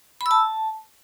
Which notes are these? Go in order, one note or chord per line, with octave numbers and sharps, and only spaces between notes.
B5
E6
A5